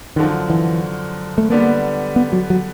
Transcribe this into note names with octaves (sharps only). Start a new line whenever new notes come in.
F#2 D3 D#3 F3
E3
A3
D3 G3 A#3 B3 D4
B3
F#3
F#3